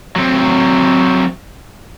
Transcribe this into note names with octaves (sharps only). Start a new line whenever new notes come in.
F#3 C4